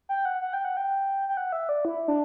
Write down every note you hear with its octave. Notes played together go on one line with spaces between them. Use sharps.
G5
F#5
F#5
G5
F#5
G5
G5
F#5
E5
D5
E4
D4